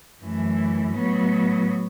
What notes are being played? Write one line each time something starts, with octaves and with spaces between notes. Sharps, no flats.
F#2 E3 A3
A2 F#3 B3